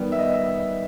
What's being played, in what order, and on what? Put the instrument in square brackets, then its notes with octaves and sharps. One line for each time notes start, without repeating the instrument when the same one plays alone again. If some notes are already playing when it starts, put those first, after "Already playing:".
Already playing: [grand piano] D#3 G3 B3
E5
D#5
E5